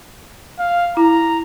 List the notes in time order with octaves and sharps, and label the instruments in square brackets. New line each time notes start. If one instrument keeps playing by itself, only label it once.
[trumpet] F5
[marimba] E4 [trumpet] A#5